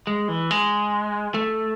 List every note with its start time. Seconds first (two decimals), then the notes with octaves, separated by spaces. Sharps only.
0.07 G#3
0.28 E3
0.51 G#3
1.34 A3